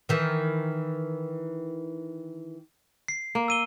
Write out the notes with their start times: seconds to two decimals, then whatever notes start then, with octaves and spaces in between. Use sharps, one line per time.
0.09 D#3 E3
3.08 C7
3.35 A#3
3.48 E6 D#7 G7